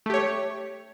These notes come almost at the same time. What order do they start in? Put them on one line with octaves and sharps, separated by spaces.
A3 G4 C#5